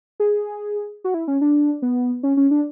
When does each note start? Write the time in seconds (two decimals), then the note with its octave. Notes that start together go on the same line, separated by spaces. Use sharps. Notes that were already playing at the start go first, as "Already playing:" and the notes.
0.20 G#4
1.04 F#4
1.14 E4
1.28 C#4
1.41 D4
1.82 B3
2.23 C#4
2.37 C#4
2.51 D4